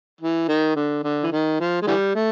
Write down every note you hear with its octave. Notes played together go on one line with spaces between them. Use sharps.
E3
D#3
D3
D3
E3
D#3
F3
G#3
D3 E3 G3
A3